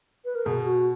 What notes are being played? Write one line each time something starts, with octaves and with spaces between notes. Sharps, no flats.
B4
A#4
B2 G#4
F#4